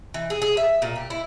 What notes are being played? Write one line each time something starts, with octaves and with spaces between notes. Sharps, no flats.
E3
G#4
G#4
E5
A#2
G4
E4